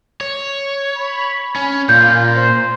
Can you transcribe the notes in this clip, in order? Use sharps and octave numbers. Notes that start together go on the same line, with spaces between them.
C#5
B5
C#4
A#2 F4 G6
C5